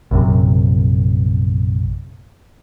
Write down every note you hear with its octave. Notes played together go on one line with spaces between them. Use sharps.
A#1 F#2 C3